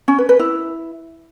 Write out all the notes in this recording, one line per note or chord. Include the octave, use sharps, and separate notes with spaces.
C#4
B4
B4
E4